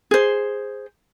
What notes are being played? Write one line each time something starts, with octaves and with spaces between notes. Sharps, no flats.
G#4 C5